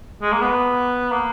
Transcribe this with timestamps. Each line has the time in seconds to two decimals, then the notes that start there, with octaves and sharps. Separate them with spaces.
0.22 G#3
0.32 A#3
0.42 B3
1.11 A#3